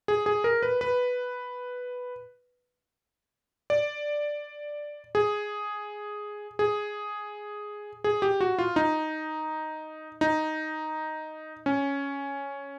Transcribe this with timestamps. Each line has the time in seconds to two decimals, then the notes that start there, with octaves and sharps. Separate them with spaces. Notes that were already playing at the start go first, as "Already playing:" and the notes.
0.08 G#4
0.26 G#4
0.44 A#4
0.63 B4
0.81 B4
3.70 D5
5.15 G#4
6.59 G#4
8.04 G#4
8.22 G4
8.41 F#4
8.59 F4
8.76 D#4
10.21 D#4
11.66 C#4